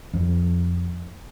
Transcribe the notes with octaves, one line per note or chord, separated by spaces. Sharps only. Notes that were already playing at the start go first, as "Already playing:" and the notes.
F2